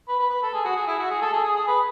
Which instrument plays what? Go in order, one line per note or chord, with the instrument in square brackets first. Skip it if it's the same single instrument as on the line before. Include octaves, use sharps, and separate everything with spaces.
[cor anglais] B4
B4
B4
A4
G#4
F#4
G#4
E4
F#4
G#4
A4
G#4
G#4
G#4
B4